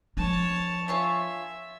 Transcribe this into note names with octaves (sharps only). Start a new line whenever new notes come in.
F3 D4 C#5 A5
F4 C#5 E5 G#5